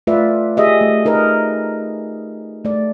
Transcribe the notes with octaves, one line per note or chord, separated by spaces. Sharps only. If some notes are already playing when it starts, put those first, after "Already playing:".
A3 F4 B4 D5 E5
G4 G#4 D#5 E5
A3
D#4 A#4 B4 D#5
A3 D5